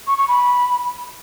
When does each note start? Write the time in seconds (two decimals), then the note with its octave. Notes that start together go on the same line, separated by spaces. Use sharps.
0.07 C#6
0.17 C#6
0.28 B5